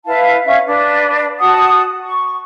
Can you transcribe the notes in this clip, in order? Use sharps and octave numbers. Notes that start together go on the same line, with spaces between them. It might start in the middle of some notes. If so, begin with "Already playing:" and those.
E4 B4 F5 A5
C#4 E5 F5
D4 B4
F#4 F#5 A5 D#6
C#6